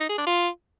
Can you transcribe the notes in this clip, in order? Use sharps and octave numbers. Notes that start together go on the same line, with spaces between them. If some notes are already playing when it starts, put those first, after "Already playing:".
D#4
G#4
D4
F4